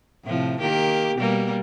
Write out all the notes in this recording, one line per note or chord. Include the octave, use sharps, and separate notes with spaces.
A2 C3 F3
D#3 A#3 G4
B2 G3 A#3